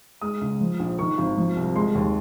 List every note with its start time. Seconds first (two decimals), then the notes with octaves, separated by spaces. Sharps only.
0.21 G#3 D#6
0.41 C#2
0.61 F3
0.80 A#1
0.98 D#3 C#6
1.18 G#1
1.37 F3
1.57 C2
1.76 G#3 C6
1.95 D#2